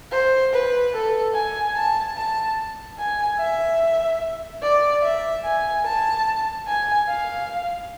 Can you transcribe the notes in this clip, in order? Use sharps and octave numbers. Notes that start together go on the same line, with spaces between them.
C5
B4
A4
G#5
A5
A5
G#5
E5
D5
E5
G#5
A5
G#5
F5